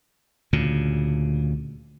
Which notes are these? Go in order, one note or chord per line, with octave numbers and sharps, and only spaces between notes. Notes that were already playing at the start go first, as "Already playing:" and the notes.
D2 A#2 C#3